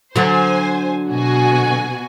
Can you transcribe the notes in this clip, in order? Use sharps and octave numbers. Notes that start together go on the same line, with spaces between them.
D3 F#3 C5 G#5
B2 F#4 G#5